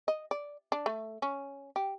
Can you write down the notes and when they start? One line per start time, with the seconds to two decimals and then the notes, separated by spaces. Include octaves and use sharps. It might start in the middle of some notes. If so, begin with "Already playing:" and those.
0.08 D#5
0.31 D5
0.72 D4
0.86 A3
1.22 C#4
1.76 G4